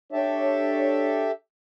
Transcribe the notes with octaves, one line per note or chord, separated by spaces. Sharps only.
D4 G4 A4 C#5 E5